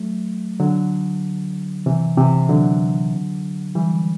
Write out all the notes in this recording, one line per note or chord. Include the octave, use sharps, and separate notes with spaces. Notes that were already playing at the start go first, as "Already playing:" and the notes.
Already playing: F#3 A3
D3 F#3
C3 E3
C3 E3
D3 F#3
E3 G3